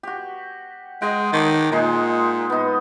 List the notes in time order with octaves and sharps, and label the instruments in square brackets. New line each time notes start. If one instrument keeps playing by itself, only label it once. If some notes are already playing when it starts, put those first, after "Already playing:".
[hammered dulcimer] F#4 G4
[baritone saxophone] G#3 [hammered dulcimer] D#5 F#5 G5
[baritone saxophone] D#3 [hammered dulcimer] A5 C6 D6
[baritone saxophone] A#2 [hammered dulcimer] G#3 D#4 G#4
[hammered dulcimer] B3 D#4